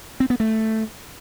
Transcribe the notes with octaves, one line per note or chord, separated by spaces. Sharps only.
C4
B3
A3